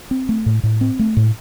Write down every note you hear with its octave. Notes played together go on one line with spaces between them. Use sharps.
C4
A3
A2
A2
C4
A3
A2